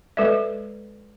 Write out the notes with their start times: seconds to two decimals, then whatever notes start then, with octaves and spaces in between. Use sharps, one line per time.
0.17 G#3 A4 B4 D5 E5